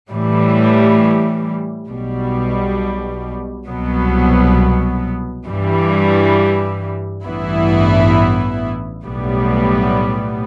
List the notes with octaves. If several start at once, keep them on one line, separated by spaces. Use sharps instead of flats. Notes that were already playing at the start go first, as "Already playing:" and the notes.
A2 E3 G3
B1 B2 G3
C2 B2 F#3 B3
G2 E3 G3
A1 G2 E3 B3 E4
B1 A2 G3 B3